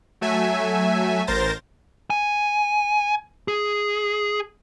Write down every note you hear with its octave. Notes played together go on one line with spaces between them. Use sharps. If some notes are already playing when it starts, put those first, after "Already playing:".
F#3 A3 E5 G#5
A1 A#4 C5 G6 A6 A#6
G#5
G#4